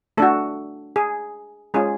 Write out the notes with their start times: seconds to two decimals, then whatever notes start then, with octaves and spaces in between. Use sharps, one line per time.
0.17 A3 D4 F#4 A4
0.96 G#4
1.74 G#3 C#4 F4 G#4